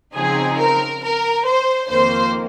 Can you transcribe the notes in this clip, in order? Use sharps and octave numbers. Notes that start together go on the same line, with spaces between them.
C#3 F3 C4 D#4 G#4
A#4
A#4
C5
F2 D#3 A#3 C5